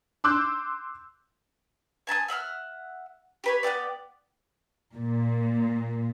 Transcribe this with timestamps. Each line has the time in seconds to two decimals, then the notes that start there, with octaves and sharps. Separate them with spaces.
0.24 C6 D6 E6 F#6 G6
2.07 G#5 A5 B5 D#6
2.28 E5 F#5 E6 F6
3.44 G4 B4 C#5
3.63 B3 F#4 G4 D5
4.95 A#2